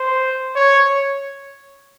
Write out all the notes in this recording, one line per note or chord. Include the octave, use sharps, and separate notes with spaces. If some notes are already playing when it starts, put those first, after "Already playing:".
Already playing: C5
C#5